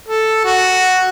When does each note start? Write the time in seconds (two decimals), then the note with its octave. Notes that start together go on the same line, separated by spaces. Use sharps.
0.08 A4
0.45 F#4